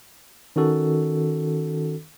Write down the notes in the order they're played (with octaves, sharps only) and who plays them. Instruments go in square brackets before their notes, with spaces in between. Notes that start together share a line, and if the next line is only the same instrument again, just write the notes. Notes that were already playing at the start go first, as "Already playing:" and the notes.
[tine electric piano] D#3 C#4 F#4 A4